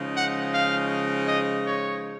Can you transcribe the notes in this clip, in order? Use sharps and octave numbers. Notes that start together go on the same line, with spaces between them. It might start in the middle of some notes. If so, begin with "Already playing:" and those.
Already playing: C#3 F3 G#3 D#4
F#5
F5
D#5
C#5